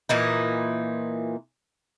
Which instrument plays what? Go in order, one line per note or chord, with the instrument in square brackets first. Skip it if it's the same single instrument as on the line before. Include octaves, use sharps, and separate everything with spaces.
[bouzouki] A#2 E3 D#4